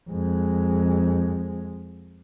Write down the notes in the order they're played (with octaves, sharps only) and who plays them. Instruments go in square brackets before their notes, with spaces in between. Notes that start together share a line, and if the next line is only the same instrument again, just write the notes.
[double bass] F2 G#3